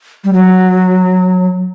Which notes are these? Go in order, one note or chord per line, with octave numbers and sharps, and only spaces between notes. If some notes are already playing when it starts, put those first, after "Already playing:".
G3
F#3